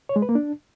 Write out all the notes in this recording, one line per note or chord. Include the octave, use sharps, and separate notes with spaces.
C#5
G#3
B4
A#3
D4